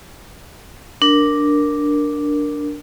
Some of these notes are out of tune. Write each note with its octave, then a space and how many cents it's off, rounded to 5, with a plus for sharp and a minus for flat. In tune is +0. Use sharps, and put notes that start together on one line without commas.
D4 +0 A#4 +0